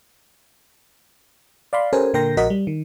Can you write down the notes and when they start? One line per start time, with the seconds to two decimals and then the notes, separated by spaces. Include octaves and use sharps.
1.73 D5 F5 B5 C6
1.93 C#4 G4 A4 A#4 C5 G#5
2.14 A#2 D3 A#4 G5 C6 A#6
2.37 A#1 F#4 A#4 D#5 F#5 B6
2.50 G3
2.67 D#3